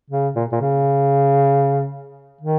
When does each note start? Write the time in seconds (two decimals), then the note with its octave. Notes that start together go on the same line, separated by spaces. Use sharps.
0.10 C#3
0.36 A#2
0.52 A#2
0.61 C#3
2.41 D#3